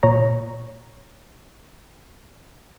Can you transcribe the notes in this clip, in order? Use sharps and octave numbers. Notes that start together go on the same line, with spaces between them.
A#2 C#5 A#5